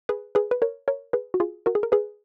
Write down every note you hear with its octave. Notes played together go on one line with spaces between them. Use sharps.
G#4 B4
G#4 B4
B4
A#4 C#5
A#4 C#5
G#4 B4
F#4
F4 G#4
F#4 A#4
G#4
A#4
G#4 B4